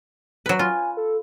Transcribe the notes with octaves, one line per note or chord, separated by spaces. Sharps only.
F#3 B4
F4 G#5
A4